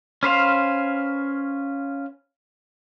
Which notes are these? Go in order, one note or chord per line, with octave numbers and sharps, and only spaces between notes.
C#4 B4 C5 F5